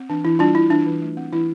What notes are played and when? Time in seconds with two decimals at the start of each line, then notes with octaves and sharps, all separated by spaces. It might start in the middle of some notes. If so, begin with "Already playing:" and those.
Already playing: C4
0.10 E3 D4
0.25 E3 E4
0.39 G3 D4 F4
0.55 D4 E4
0.70 E3 D4
0.87 E3
1.02 A3
1.17 C4
1.32 E3 E4